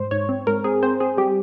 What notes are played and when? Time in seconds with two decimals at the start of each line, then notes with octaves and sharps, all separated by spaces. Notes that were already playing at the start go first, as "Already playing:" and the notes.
Already playing: G#2 C5
0.11 G#2 C#5
0.29 C4
0.47 G#2 A#4
0.64 C4 G#4
0.83 C4 C5
1.00 C4 G#4
1.18 G3 G4